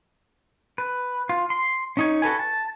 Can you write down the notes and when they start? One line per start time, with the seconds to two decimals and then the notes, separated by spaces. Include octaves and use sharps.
0.78 B4
1.29 F4
1.50 C6
1.97 C#4 D#4 C#5
2.22 F#4 A4 B4 G#5
2.39 A5